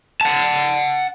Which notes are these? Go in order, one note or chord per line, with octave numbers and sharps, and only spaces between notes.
F#5 A5